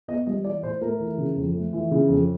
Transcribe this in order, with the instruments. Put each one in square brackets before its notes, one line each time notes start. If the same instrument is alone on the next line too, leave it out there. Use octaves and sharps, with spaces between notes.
[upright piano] B3 D#5
G3 D#5
E3 D5
A2 C5
A3 A#4
E3
C#3
F2
A3
E3
C#3
F2